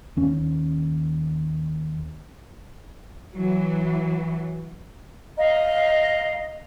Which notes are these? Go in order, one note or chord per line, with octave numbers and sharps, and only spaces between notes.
D#2 C#4
E3 F#3
D#5 F5 A#5